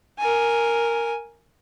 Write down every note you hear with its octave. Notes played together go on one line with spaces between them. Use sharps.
A#4 G#5